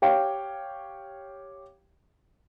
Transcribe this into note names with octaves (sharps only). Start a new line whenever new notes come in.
G4 C#5 F5 G5